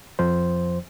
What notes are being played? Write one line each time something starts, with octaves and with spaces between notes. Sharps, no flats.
F2 F3 C5